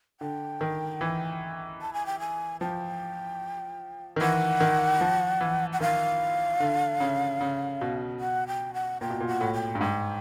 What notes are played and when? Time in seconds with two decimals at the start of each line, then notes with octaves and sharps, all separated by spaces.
0.20 D3 G5
0.61 D#3
1.01 E3
1.81 A5
1.94 G#5
2.06 G5
2.20 G#5
2.61 F3 G5
4.16 D#3
4.21 E3 F#5
4.60 D#3
5.01 F3
5.41 E3
5.73 F#5
5.80 D#3 F5
6.60 D3
7.00 C#3
7.41 C#3
7.81 B2
8.20 F#5
8.48 G5
8.74 F#5
9.01 A#2 G5
9.10 B2
9.20 A#2
9.27 F#5
9.41 A2
9.54 G5
9.75 G2
9.81 G#2 G5